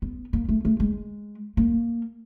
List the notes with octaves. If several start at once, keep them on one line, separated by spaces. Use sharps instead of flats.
B3
A#3
A3
A3
G#3
A#3